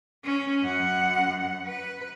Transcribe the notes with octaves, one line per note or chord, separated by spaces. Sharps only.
C#4
F#2 F#5
B4